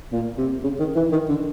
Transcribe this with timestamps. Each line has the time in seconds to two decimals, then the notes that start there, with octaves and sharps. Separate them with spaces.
0.13 A#2
0.38 C3
0.64 C#3
0.79 D#3
0.96 E3
1.12 D#3
1.29 D3